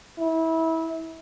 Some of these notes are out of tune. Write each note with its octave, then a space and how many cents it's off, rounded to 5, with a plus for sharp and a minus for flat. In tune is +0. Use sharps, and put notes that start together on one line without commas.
E4 -25